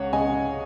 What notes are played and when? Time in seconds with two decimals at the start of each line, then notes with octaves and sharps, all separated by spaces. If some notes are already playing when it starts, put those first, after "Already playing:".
Already playing: C#2 C#5 F#5
0.13 C#2 D#5 G#5